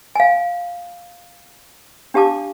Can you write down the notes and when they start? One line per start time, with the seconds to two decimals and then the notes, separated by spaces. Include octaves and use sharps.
0.15 F5 G#5
2.14 D4 G4 F5 A5 D6